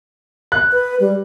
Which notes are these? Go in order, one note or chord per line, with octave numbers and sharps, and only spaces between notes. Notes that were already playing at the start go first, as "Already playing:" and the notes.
F#6
B4
G3